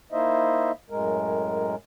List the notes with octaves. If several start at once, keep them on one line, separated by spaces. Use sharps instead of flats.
A#3 D#4 E4 C5 D#5 E5
F#2 A2 G#3 A#4